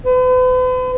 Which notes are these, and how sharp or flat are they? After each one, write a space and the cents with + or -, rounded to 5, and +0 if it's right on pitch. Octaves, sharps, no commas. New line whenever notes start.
B4 +45